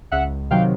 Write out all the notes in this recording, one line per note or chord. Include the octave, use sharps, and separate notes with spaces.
C#2 E5 F#5
C3 D#3 F#3 F5 G5